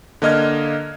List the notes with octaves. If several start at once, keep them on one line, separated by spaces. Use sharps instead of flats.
D3 A#3 D#5 F6 G#6